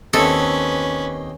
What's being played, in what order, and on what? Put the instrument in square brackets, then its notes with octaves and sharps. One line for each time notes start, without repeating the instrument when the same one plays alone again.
[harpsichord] D#2 C4 D#5 [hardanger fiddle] C#4 B4 [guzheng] A4